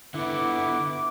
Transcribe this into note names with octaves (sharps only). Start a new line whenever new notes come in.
D3 B3 E4 F#5 D6